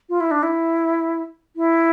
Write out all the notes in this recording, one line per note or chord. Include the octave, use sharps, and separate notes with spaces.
F4
E4
D4
E4
E4